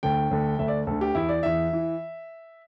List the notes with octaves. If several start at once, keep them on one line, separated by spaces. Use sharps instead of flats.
D2 D3 G5
D2 D3
D2 D3 E5
D5
D2 D3 A4
G4
E2 E3 E4
D5
E2 E3 E5
E3